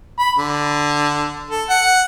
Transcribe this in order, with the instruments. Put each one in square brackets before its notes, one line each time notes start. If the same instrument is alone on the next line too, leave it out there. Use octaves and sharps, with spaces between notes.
[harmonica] B5
D3
A4
F#5